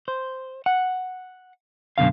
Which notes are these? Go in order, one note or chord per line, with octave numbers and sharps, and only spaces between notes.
C5
F#5
F#2 B2 D3 F5